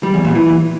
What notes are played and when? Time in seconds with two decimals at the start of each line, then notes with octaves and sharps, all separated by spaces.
0.03 G3
0.14 E2
0.25 A#2
0.35 E3